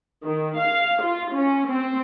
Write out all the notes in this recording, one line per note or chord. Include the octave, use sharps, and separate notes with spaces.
D#3
F5
F4
C#4
C4